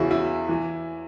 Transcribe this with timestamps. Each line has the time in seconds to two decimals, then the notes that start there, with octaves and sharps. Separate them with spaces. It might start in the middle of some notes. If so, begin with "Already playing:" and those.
Already playing: E2 C#3 E3 E4 F#4
0.11 E4
0.49 E3